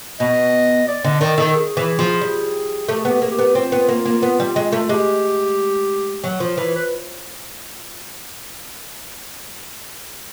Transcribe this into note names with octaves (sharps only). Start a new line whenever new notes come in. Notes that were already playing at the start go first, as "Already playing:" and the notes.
B2 D#5
D5
D3 D#5
D#3 D5
D#3 A4
G#4
E3
F3
G3
A3 G4
G#4
B3 G4
A#3 G#4
G4
B3
C4 F4
B3
A#3
A#3
B3
G3
G#3
A3
G#3 G4
F#3
F3
E3
B4